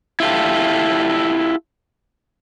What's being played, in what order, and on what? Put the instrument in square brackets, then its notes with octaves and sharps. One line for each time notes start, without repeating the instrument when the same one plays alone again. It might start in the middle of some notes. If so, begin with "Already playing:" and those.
[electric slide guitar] E4 F4 G4 A4